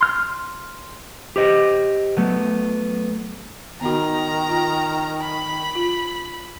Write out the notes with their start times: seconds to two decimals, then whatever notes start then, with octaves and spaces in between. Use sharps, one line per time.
0.01 C6 F6
1.36 G4 C5 D#5
2.17 F#3 A3 B3
3.81 D#3 B3 D#4 F#4 A#5
4.49 F4
5.21 B5
5.75 F4